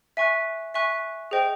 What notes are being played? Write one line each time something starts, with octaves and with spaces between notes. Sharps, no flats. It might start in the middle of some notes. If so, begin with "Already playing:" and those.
E5 G#5 C#6 F#6
E5 G#5 C#6 F#6
G#4 C5 D#5 G5